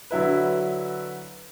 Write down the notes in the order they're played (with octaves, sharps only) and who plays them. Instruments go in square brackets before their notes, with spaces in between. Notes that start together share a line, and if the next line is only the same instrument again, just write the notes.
[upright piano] D3 F#3 E4 B4